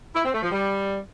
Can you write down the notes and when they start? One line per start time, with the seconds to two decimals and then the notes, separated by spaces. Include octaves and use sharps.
0.14 E4
0.24 C4
0.33 A3
0.42 F3
0.51 G3